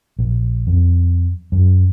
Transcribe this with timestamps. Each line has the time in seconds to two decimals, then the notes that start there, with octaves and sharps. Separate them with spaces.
0.19 A#1
0.67 F2
1.52 F#2